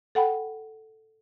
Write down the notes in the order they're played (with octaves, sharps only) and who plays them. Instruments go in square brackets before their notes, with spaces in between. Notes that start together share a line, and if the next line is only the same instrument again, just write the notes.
[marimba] A4 F#5 G5 B5